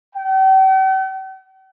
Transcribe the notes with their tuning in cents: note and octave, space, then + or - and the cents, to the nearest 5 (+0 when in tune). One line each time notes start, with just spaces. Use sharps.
G5 -45